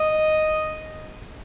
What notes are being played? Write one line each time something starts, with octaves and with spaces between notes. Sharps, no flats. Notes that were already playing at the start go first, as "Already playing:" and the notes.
Already playing: D#5